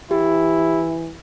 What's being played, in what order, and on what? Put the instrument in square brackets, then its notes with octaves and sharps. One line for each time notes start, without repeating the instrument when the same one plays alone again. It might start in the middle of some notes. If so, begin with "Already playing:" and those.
[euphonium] E3 [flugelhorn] E4 [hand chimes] G4